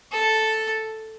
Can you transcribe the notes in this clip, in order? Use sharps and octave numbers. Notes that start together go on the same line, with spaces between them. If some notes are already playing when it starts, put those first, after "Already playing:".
A4